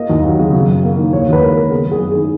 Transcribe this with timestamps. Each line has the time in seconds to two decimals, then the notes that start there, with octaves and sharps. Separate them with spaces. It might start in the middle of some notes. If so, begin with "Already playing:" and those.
Already playing: A#3 D#5
0.10 D#2
0.24 F#3
0.39 C#3
0.53 F#2
0.68 F#2
0.84 A#3
0.98 D#3
1.13 D#2 C#5
1.28 D#2 B4
1.42 G#3 A#4
1.57 C#3
1.71 B3 G#4
1.86 F#2
1.92 G#4
2.01 G#3
2.12 G#4
2.15 D#3